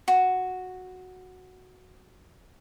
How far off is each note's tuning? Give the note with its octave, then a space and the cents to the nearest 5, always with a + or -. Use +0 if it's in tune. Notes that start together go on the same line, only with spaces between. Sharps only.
F#4 -5